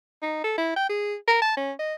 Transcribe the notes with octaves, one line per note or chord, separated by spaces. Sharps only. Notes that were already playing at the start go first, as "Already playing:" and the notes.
D#4
A4
E4
G5
G#4
A#4
A5
C#4
D#5